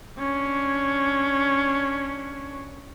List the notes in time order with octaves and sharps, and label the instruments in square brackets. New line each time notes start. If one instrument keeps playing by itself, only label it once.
[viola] C#4 D4